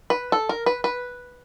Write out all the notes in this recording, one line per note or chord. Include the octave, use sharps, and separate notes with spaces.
B4
A4
A#4
B4
B4